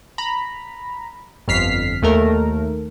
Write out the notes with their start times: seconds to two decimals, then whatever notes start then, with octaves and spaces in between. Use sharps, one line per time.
0.18 A#5 B5
1.48 G1 F2 F6 B6 C7
2.02 D#2 A3 A#4